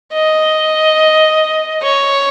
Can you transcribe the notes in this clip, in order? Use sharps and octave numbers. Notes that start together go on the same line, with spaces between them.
D#5
C#5